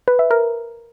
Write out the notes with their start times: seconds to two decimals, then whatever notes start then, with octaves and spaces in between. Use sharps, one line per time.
0.08 B4
0.19 E5
0.31 A#4